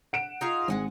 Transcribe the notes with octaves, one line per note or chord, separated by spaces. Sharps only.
F#5 D7 E7
D#4 F4 G#4
G#1 G#3 F#5 G#5